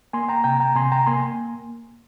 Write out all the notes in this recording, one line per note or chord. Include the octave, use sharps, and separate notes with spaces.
A#3 G#5 C6
G5 A#5
C3 G5 A#5
G5 A#5
C3 G#5 C6
G5 A#5
A#3 G#5 C6